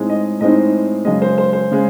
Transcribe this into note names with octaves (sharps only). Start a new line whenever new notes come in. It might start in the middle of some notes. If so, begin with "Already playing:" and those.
Already playing: A2 G#3 C4 D#4
D#5
A2 G#3 C4 D#4 D#5
F#2 C#3 G#3 D#5
C5
C5
C5
C#3 G#3